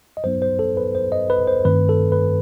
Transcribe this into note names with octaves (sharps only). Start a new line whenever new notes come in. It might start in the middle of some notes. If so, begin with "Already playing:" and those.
D#5
G2 F#3 B3 D#4 C5
C5
A4
B4
C5
D#5
B4
C5
G2 D#3 A3 C4 B4
A4
B4